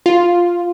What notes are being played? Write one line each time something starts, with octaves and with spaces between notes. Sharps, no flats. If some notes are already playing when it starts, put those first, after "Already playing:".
F4